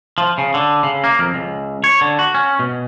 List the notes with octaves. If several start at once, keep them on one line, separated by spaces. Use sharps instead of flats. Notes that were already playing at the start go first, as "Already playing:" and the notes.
F3
C#3
D3
C#3
A#3
F2
C#2
C#5
D3
F#4
C#4
B2